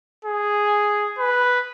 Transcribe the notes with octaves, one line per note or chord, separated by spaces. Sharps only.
G#4
B4